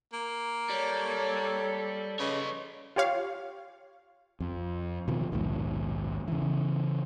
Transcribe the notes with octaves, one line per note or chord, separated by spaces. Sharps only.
A#3
G3 A4 C#5
C#3 B4 C#5 D#5
F4 G4 C#5 F5
F2
B2 D#3 F3
A#1 D#2 G#2 B2
C#3 E3